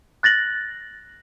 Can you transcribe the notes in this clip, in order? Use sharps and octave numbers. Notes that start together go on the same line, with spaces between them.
F#6 A6 A#6 F#7